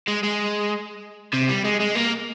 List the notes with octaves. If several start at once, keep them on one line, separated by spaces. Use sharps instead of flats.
G#3
G#3
C3
G3
G#3
G#3
A#3